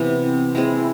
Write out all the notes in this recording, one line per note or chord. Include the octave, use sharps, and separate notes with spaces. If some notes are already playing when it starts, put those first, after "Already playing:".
Already playing: C3 E3 B3
C4
G#3 C4 E4 G#4